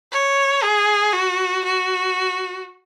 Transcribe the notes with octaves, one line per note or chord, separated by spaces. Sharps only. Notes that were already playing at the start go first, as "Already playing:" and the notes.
C#5
G#4
F#4
F#4